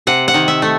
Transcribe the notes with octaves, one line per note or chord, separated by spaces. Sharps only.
C3 F#5
F#5
D#3
E5
A3